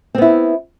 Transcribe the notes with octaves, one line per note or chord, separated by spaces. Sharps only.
B3 C4 E4